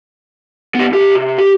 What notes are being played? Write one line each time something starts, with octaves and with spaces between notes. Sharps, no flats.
B3 G4
C2 G4
C3
G4